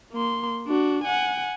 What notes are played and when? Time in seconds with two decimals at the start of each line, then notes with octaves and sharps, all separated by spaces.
0.12 A#3 C6
0.67 D4 F#4
1.04 F#5 G#5